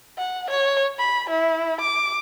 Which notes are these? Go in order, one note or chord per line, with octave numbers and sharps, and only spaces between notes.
F#5
C#5
B5
E4
D6